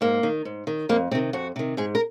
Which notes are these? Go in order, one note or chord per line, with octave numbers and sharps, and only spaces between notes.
G#2 A#3
D#3
G#2
D#3
F2 A#3
C3 D#3 C4
F2 F#4
C3 D#3
G#2 G#4
A#4